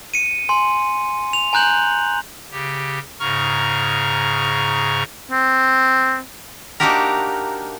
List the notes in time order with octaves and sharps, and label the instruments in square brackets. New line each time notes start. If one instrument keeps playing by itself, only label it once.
[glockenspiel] C#7 D#7
G#5 C6
F7
G#5 A#5 F#6 G6 F#7
[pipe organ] C#3 G4
G#2 C#3 A#5 C#6 F6
[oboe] C4
[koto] A#3 D4 D#4 F#4 G4 A#4